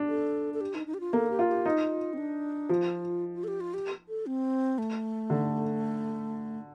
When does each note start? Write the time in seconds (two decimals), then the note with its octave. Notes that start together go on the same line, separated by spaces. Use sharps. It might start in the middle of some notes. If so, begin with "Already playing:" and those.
Already playing: D4
0.09 A4
0.54 A4
0.61 G4
0.75 D#4
0.87 D#4
0.94 G4
1.00 F4
1.13 A#3 A4
1.30 G4
1.39 F4
1.48 G4
1.65 D#4 F4
2.13 C4
2.18 D4
2.69 F3 F4
3.35 F4
3.44 A4
3.48 G4
3.61 F4
3.74 G4
4.09 A4
4.26 C4
4.78 A3
5.30 D3